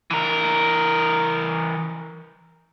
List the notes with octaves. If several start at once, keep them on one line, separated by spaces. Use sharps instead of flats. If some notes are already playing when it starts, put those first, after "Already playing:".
E3 A#4